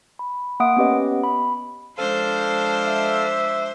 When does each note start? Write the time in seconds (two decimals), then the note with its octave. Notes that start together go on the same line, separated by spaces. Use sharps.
0.19 B5
0.60 A#3 E5 F#5 C6 D#6 D7
0.77 B3 C#4 G4 B4 D#5
1.24 B5
1.98 F3 G#3 D4 A4 C5 F5
2.87 E5